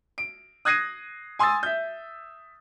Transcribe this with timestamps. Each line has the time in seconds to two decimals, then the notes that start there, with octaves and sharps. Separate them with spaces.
0.18 D7
0.65 D#6 F#6 G#6 A#6 C7 D#7
1.39 G#5 C6 D#6 E6 A6
1.63 E5 G6